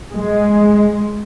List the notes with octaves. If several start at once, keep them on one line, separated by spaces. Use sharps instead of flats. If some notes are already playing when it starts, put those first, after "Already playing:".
G#3